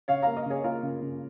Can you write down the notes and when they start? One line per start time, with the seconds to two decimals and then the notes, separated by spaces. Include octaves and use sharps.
0.08 C#3 C#5 F5
0.22 A#3 F5 A#5
0.36 A#4 D#5
0.46 C#3 G#4 C#5
0.64 A#3 F4 A#4
0.83 C#3
1.02 C#3